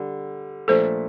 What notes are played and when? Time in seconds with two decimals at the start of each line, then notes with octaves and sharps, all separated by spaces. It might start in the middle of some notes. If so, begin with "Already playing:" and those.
Already playing: D3 G3
0.68 A#2 F3 A3 D4 A4 C5